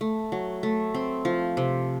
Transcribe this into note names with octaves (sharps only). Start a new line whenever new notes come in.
A3
F#3
A3
C4
F3
C3